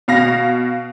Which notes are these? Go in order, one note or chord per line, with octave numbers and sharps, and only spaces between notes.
B2 F5 A#6